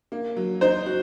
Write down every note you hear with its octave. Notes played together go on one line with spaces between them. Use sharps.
A#3
F#3
D#4 C5
F#4